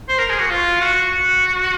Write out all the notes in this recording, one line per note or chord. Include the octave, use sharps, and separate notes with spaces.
C5
A#4
G#4
F#4
F4
F#4
F#4